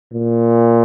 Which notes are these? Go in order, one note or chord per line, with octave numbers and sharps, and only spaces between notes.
A#2